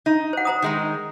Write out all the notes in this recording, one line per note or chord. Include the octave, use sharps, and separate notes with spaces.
D#4
C5 F#5
C5 A#5 D#6
D#3 G#3 D#4